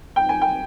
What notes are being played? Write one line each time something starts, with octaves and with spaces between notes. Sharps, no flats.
G5
G#5
G5